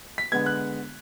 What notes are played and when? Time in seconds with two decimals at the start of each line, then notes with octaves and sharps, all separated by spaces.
0.18 B6
0.32 D3 G#3 B3 G#6
0.46 F#6